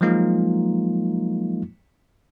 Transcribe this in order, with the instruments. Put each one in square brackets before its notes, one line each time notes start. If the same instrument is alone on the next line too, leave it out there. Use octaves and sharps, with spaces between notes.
[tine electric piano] F3 F#3 G#3 A#3 D#4 F4